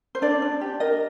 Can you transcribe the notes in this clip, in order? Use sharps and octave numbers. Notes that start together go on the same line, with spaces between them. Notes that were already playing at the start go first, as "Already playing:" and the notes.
C5
D4 D5
D4
G4
A#4 D#5